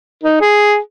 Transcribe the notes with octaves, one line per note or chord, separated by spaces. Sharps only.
D#4
G#4